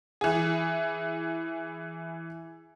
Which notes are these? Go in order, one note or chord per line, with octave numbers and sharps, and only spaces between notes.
E3 G#4